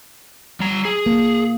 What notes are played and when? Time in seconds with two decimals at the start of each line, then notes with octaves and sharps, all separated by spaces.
0.60 G3 A#5
0.85 G#4
1.06 A#3